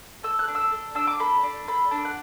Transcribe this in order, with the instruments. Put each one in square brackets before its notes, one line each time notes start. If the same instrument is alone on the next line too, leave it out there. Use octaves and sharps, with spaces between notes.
[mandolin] A4 E6
F#6
D4
E6
A4
D4 E6
D6
A4 B5
D4
A4 B5
D4
F#5